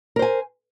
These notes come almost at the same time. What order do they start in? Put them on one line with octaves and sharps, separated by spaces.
A#4 C5 G#5